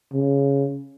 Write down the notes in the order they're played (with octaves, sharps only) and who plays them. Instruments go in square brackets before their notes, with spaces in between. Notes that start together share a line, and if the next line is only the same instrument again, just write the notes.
[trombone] C#3